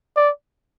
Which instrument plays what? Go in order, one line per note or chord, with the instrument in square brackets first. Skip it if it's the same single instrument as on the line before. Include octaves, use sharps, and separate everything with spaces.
[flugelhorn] D5